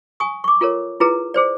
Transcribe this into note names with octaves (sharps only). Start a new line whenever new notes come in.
G#5 C#6 D#6
C#6 D6
F4 A4 A#4 C#5
E4 F4 G#4 B4 A#5
G#4 C5 D5